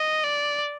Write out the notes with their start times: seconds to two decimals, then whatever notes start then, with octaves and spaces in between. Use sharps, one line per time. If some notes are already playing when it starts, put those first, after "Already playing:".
Already playing: D#5
0.24 D5